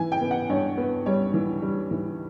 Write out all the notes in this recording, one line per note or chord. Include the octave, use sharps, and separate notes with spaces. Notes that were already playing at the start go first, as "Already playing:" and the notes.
Already playing: E3 G#5
G5
B3
F#5
G2 C#5
B3
G3 C#5
E3
G3
E3